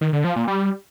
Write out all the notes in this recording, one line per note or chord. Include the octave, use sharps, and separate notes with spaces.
D#3
D3
F3
A#2
G3